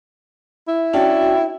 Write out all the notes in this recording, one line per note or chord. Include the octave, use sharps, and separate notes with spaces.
E4
C#4 D4 F#4 G5